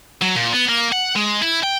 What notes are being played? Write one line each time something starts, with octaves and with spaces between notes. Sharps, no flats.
F#3
A#2
B3
A#3
F#5
G#3
E4
G5